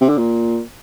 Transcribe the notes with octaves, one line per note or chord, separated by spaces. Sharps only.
C3
D3
A#2